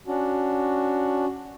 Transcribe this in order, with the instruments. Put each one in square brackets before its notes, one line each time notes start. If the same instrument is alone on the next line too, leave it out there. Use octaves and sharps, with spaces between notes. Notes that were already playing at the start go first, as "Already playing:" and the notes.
[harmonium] C#4 D4 F#4